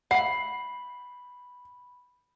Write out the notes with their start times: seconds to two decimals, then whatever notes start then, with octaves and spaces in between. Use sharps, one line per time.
0.11 E5 F#5 B5 C7